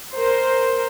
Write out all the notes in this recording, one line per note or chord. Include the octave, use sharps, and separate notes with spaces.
A#4 C5